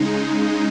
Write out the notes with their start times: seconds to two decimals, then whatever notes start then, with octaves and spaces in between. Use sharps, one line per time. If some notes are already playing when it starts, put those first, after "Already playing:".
Already playing: C#3 G#3 D#4